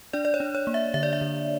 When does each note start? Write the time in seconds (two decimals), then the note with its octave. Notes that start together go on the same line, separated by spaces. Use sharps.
0.13 D4 D5
0.25 D5
0.34 C#5
0.40 D4
0.55 C#5
0.67 A#3
0.74 E5
0.94 D3 E5
1.03 D5
1.13 E5
1.21 D3